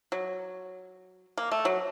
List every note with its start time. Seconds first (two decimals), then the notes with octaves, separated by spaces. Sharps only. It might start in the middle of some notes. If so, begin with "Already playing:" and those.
0.12 F#3
1.38 A#3
1.52 A3
1.65 F#3